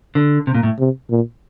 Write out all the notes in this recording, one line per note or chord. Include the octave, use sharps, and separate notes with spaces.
D3
C3
A#2
A2
C3
A#2